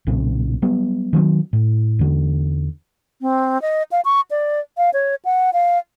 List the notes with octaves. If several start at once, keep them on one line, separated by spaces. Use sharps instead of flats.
B1 A#2 C#3 C4
F#3 G3 B3
D#3 F#3 G#3 C4
A2
E2 D3
C4
D#5
F5
C#6
D5
F5
C#5
F#5
F5